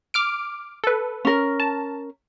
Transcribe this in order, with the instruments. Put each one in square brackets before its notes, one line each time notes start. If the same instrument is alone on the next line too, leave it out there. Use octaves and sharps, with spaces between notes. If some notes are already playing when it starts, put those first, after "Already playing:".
[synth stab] D6 F6 D7
A4 B4
[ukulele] C#4 A#4
[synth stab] A5